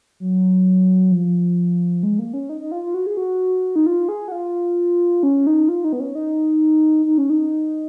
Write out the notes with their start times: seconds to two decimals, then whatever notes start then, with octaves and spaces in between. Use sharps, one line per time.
0.20 F#3
1.12 F3
2.03 G#3
2.19 A#3
2.34 C#4
2.49 D#4
2.61 D#4
2.72 F4
2.83 F4
2.94 F#4
3.06 G#4
3.17 F#4
3.76 D#4
3.86 F4
4.09 G#4
4.28 F#4
4.32 F4
5.23 C#4
5.47 D#4
5.69 F4
5.84 D#4
5.93 B3
6.00 C#4
6.15 D#4
7.06 D#4
7.18 C#4
7.30 D#4